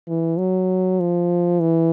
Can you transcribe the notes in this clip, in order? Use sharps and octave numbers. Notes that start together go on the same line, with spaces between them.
E3
F#3
F3
E3